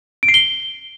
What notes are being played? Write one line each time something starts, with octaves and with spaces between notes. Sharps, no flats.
D7
C7
G7